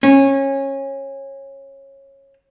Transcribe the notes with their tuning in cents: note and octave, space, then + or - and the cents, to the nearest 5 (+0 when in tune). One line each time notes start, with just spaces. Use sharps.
C#4 -20